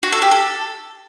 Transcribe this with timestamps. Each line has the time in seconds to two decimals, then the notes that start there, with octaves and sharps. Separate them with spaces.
0.03 F#4
0.12 A4
0.22 G4
0.31 A4